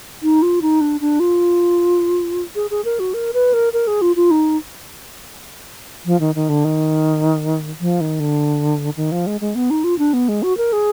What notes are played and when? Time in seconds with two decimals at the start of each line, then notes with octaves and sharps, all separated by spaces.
0.23 D#4
0.42 F4
0.62 D#4
0.81 D4
1.01 D4
1.20 F4
2.55 G#4
2.70 G#4
2.85 A#4
2.99 F#4
3.14 A#4
3.34 B4
3.53 A#4
3.73 A#4
3.87 G#4
4.01 F4
4.16 F4
4.31 D#4
6.05 F3
6.20 D#3
6.35 D#3
6.49 D3
6.64 D#3
7.81 F3
8.00 D#3
8.20 D3
8.97 D#3
9.12 F3
9.27 G#3
9.41 G#3
9.55 B3
9.70 D#4
9.84 F4
9.98 D4
10.13 B3
10.28 G#3
10.43 F#4
10.57 A#4
10.72 G#4